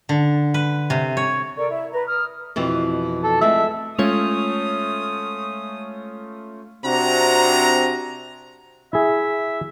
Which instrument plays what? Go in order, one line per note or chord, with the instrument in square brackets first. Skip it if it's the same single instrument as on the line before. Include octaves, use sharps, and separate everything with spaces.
[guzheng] D3
B4
C3
C#5
[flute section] A4 A#4 D5 C#6
E4
B4 A#5
D#6 F6
[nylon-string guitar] F2 B2 E3
[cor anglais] A4
[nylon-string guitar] F2 G#3 A3 [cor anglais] E5
[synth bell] G#3 C#5 F7 [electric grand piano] A3 C#4 F4 [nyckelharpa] D#6
[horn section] C3 C4 D4 F#4 A#5
[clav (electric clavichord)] E4 G#4 [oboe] E5